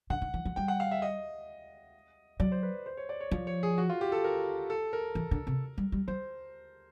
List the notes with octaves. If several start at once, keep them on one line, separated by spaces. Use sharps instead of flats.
D3 F#5
D#3
E3
F3
G3 G5
F#5
F5
E5
D#5
F#3 D5
C5
B4
C5
C#5
D5
C#5
F3 C#5
C#5
G#4
F#4
F4
G4
A4
A#4
A4
A#4
E3
D3
C3
G3
G3
F#3 C5